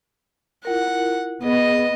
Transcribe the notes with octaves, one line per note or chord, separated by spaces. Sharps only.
E4 F4 A#4 F#5
B3 G#4 D#5